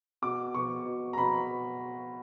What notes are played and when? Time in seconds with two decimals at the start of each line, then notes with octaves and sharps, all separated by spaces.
0.22 B2 D6
0.54 B2 C#6
0.86 B2
1.13 A#5
1.18 B2 B5